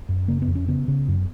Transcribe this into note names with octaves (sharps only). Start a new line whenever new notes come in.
F#2
C#3 A#3
B3
F2
C#4
C#3 B3
C#3
F#2